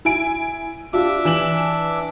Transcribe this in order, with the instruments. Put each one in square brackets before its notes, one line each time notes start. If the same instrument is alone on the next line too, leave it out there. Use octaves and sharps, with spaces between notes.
[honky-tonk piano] E4 G#5 D7
[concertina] D4 E5 D6 [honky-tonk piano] F4 G4
[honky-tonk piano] E3 E7 F#7